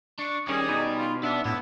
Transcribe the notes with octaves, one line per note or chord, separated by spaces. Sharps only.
D4 C#6
D#3 C#4 G4 G#4 D5
B2 D#4
F4
B3 D4 E5
A2 B3 E4